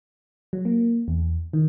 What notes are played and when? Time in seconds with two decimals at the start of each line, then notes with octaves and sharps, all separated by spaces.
0.53 F#3
0.65 A#3
1.08 E2
1.53 D#3